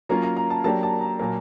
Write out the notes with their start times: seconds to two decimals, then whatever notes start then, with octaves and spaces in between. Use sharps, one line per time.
0.09 F#3 A#3 C#4 F4 A#5
0.23 A#5
0.37 A#5
0.50 A5
0.64 F#3 A#3 D4 G4 A5
0.83 A5
1.01 A#5
1.20 A#2 F#3 A#3